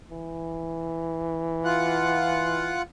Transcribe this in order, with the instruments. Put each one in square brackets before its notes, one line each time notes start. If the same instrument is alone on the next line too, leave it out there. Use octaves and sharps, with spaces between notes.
[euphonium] E3
[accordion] F4 F#5